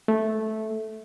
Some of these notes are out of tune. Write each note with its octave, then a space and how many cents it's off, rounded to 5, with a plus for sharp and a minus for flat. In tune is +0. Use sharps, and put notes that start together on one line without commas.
A3 -10